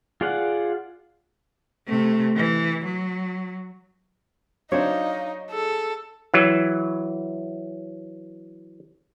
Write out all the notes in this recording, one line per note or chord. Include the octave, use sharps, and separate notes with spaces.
F4 G#4 D5 F5 F#5
C3 A3
E3
F#3
F#3 D4 D#4 C5 C#5 F5
G#4 A4
E3 F#3